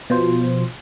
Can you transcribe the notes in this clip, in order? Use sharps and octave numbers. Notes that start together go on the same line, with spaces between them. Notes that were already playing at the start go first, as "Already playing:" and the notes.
B2 F3 C5